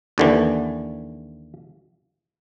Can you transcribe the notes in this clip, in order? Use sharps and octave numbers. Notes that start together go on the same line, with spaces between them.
D#2 D3 E3